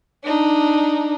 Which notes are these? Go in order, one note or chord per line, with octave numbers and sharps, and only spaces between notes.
D4 D#4